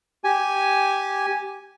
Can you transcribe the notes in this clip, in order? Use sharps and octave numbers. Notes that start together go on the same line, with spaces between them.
G4 G#5